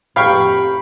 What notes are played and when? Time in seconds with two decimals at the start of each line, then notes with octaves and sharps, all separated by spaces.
0.16 F2 A2 G4 F5 G5 B5 C#6